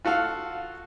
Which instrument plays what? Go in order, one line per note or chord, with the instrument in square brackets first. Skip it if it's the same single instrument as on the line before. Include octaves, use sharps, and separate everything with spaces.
[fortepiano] F4 F#4 A4 F5